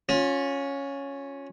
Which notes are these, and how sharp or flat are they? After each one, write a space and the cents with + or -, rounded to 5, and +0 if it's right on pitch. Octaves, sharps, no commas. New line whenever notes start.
C#4 +0 F4 +35